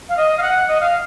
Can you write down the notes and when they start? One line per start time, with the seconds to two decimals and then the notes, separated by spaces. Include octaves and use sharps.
0.09 F5
0.17 D#5
0.38 F5
0.43 F#5
0.68 D#5
0.80 F5